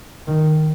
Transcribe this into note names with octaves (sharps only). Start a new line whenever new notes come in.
D#3